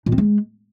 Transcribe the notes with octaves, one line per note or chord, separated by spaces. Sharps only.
A#2
C4
G#3